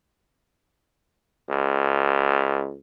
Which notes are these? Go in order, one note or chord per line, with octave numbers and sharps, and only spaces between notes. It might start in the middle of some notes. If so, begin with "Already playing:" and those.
C#2